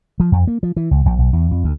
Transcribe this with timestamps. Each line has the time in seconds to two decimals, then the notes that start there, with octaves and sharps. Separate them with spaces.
0.20 F3
0.32 F2
0.47 A#3
0.63 F3
0.77 E3
0.91 C#2
1.06 A#1
1.18 B1
1.33 E2
1.51 F2
1.64 D2